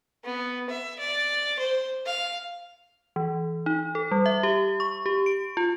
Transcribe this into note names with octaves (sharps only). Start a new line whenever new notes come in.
B3
E5
D5
C5
F5
E3
D#4
A4
G3
E5
G4
C#6
G4
D7
F4